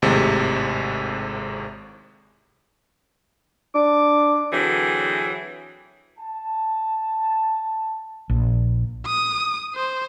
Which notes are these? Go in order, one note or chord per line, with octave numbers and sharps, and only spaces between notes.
G#1 D#2 A2 C3 G#3
D4 D6
D3 E3 F#3 C4 G#4
A5
A#1
D#6
C5